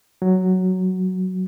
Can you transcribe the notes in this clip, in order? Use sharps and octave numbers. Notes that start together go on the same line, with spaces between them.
F#3